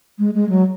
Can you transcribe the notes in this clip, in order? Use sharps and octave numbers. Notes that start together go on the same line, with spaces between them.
G#3
G#3
F#3